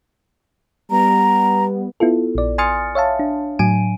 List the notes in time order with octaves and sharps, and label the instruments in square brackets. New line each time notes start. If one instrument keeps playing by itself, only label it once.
[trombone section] G3 B3 [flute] A#5
[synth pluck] B3 E4 F4 A4
A#1 D5
G#5 C6 D#6 F6 A6 C#7
C#5 E5 F5 A5
D4
A2 F#3 G#5 D7 D#7